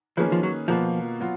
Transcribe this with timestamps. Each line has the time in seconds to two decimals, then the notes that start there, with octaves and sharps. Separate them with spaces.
0.17 D#3 F3 A#3 C#4 G#4 B4
0.32 F3
0.43 F#3
0.68 B2 F3 A#3 F4 B4
1.20 F#3 B3 F4